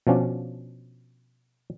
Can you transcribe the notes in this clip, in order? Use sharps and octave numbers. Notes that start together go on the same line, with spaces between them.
B2 F3 C#4 D4